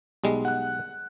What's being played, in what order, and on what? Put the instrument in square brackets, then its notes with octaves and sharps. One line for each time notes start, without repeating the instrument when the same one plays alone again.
[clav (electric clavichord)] B1 G3 G#3
[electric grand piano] F#5 F#6